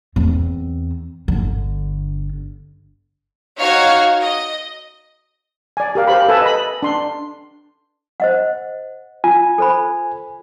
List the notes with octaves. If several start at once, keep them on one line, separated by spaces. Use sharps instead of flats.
E2 C4
G1 D3
D#4 F#4 C#5 F5 F6 G#6
D#5
D5 G#5
G4 A#4 F5
G4 C5 F5 B5
A4 B4 E5 G#5 A5
D#5 B5
D4 C6
C5 D#5 F#5
F4 G#5
A4 C5 B5